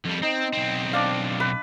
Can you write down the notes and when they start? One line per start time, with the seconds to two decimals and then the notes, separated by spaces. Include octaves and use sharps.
0.05 F2 G3
0.22 C4 D#4
0.53 B1 C4
0.93 D4 D5 F5
1.40 B4